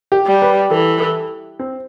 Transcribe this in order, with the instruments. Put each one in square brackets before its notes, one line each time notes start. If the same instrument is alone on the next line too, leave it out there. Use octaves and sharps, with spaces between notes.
[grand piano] G4
[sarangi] G3
[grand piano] B4
[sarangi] E3 [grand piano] A4
[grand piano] A4
C4